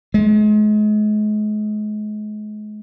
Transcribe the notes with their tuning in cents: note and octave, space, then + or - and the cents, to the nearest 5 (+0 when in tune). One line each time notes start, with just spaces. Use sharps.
G#3 +35